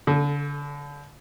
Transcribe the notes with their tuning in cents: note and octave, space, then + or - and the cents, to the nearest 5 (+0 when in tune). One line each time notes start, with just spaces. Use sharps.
D3 -35 A4 +0